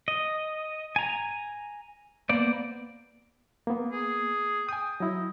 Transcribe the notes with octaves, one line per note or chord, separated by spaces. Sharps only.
D#5
G#5 A#5
A#3 B3 C5 D5
A#3 B3
G#4
G5 G#5 D#6
F#3 E4 D#5